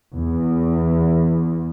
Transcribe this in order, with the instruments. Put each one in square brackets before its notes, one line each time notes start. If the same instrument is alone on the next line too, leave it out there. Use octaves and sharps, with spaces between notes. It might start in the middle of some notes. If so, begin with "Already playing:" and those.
[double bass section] E2